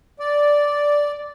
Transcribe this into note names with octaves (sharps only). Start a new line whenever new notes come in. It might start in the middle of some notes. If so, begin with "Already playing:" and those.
D5